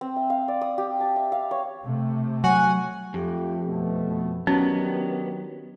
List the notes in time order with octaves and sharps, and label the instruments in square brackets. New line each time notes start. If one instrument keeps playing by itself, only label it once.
[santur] C4
E5
F5
D5
D#6
G4
A5
E5
F5
C#5
[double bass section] C3 A3
[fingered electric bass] F#3 [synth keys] F#4 F#5 [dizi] G#5
[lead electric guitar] F2 [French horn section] A3 F4 G4
[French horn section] B2 A3
[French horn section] D#3 D4 G4 [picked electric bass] F#3 [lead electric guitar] B3 [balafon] C#4